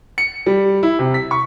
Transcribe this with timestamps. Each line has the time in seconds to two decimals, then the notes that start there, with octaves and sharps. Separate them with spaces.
0.18 C#7
0.46 G3
0.83 E4
0.99 C3
1.14 B6
1.31 C#6